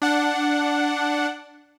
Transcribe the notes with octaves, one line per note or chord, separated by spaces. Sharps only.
D4 F#5